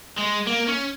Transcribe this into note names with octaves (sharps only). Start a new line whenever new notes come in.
G#3
A#3
C#4